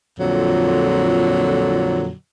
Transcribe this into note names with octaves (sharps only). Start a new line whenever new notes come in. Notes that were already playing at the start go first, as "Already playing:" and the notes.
F2 A#2 D3 F#3